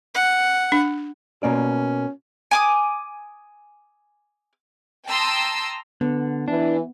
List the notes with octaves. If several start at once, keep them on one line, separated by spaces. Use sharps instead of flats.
F#5
D4
B2 A#3 C#4 D5
G#5 D6 D#6
G5 A5 A#5 C6 D#6 E6
D3 B3
E3 D4